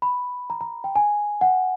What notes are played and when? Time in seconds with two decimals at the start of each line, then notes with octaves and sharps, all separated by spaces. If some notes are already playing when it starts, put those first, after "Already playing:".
0.02 B5
0.50 A#5
0.61 A#5
0.84 G5
0.96 G#5
1.41 F#5